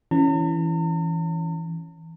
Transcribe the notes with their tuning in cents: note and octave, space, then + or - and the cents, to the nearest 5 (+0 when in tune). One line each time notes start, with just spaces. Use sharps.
E3 +0 C#4 +0 A#5 -45